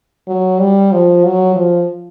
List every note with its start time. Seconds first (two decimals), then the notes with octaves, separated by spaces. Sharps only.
0.28 F#3
0.60 G3
0.92 F3
1.25 F#3
1.56 F3